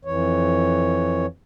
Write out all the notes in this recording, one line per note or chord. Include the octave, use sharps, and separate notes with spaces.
F2 E3 C#5